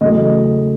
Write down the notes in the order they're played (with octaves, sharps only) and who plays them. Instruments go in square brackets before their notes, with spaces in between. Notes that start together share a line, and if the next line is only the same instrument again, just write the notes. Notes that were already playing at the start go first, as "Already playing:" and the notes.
[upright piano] E2 C#3 F#3 A3 D#5